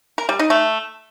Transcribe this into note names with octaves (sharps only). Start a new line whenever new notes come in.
A#4
G3
D#4
A3